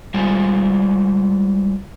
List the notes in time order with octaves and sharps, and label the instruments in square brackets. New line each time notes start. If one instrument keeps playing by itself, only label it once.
[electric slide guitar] G3 G#3 F4 C5 F5 G#5